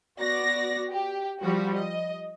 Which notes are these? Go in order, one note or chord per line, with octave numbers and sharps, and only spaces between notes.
B3 F#4 D5 A#6
G4
F3 G3 F#4
D#5